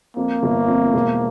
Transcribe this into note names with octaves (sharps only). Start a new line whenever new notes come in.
F2 A#3
G1
F2
E1